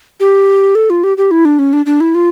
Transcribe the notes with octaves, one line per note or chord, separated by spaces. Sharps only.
G4
A4
F4
G4
G4
E4
D4
C#4
D4
D4
E4
F4